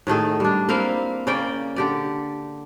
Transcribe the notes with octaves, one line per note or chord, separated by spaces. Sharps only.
A2 D#3 A3 G#4
G3 D4
A#3 C4 E4 F5
C#3 A#3 D5 G5
D3 G4 D5